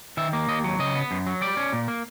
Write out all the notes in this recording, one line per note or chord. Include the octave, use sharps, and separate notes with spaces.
D#3 E5
A#3
D#2 D#5
F#3
C#3 D#5
B3
F#2
F#3
G3 D5
C#4
A#2
A#3